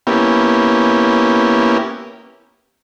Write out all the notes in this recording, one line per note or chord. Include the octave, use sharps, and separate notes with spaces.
A#3 B3 C#4 E4 G4